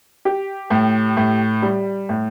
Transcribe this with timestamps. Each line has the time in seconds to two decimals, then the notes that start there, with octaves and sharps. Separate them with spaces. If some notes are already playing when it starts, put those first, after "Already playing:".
0.25 G4
0.70 A2
1.17 A2
1.62 G3
2.09 A2